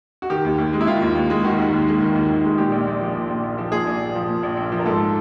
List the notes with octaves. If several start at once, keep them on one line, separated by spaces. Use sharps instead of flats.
F#4
D#3 G4
D#2
D#2
G#3
E4
D#3 F4
D#2
D#2
G#3
D#3 F#4
D#2
D#2
G#3
D#3
D#2
D#2
G#3
A#2 G4
A#1
A#1
F3
A#2
A#1
A#1
F3
A#2 G#4
A#1
A#1
F3
A#2
A#1
A#1
F3
A#4
G#2 A4